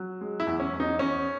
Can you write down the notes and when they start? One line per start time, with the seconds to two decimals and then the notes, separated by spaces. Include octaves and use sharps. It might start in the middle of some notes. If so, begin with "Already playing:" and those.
Already playing: F#3
0.21 G#3
0.40 E4
0.47 E2
0.60 C#4
0.73 E2
0.80 D#4
0.99 E2 C#4